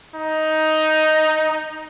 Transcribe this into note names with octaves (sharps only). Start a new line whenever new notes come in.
D#4